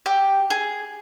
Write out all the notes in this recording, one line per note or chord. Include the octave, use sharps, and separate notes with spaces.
G4
G#4